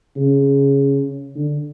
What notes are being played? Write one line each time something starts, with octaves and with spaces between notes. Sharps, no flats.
C#3
D3